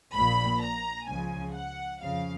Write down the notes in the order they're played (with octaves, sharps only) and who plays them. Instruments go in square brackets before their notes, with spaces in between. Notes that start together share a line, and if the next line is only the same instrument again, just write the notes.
[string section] A#1 A#2 F3 B5
A#5
C#2 C#3 F3 G#5
F#5
F2 C#3 F3 F5